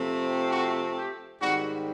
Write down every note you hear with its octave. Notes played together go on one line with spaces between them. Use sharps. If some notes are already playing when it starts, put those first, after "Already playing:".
Already playing: C3 F3 A3 C4
F#4
G4
G#2 D#3 G3 C4 F#4